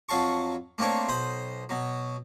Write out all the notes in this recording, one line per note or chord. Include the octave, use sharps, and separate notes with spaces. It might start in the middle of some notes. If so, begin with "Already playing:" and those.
F2 F#3 F5 A5 C#6
A3 A#3 C4 D4 C#5
B1 C5 B5 D#6
B2 F#3